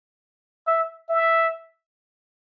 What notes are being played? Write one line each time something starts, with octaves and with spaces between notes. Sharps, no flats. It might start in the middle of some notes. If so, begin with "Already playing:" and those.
E5
E5